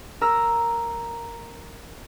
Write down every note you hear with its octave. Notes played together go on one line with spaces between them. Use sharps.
A#4 A#5 E6